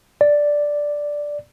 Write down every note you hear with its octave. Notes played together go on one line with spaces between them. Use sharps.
D5